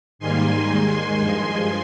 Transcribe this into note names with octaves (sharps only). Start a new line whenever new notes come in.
G#2 D#3 G3 A#3 G#5 C6
D#2 D#3 G#3
G2 F3 G#3 G#5 C6